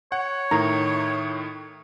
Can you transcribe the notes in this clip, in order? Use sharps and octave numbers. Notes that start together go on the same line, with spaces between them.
C#5 F#5
A2 D#3 A#5